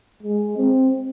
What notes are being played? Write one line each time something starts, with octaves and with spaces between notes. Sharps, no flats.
G#3
C4